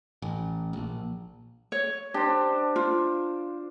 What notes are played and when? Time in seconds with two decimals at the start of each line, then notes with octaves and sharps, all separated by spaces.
0.22 A1
0.73 A#1
1.72 C#5
2.14 D4 G4 C5
2.76 F4